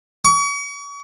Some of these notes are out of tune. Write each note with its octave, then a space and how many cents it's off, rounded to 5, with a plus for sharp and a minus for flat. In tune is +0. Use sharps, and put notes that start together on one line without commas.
C#6 +40